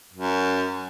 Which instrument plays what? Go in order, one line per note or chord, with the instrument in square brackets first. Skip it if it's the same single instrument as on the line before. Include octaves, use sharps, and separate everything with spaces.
[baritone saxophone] F#2